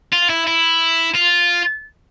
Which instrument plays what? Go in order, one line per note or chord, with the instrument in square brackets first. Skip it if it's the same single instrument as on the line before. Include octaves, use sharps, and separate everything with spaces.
[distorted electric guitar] F4
E4
E4
F4